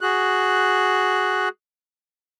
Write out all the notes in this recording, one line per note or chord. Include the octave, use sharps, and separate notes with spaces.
F#4 G#4 F#6